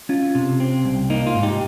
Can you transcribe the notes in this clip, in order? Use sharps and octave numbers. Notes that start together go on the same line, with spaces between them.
C#4 F4
C3
C4
C2
A#3 D#4
F4
G#2
D#4 G4